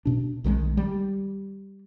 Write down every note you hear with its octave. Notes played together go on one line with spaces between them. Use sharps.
B2 D4
B1 D#3 F#3 G#3
G3